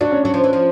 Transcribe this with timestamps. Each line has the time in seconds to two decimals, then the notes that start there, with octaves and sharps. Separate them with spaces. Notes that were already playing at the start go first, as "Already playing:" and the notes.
0.01 F#3 D4
0.12 C#4
0.23 F#3 D4
0.34 F3
0.44 E3
0.53 F3